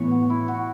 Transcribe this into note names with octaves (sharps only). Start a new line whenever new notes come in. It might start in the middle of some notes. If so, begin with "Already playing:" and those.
Already playing: A2 E3 B3 C#5
F#4
E4
F#4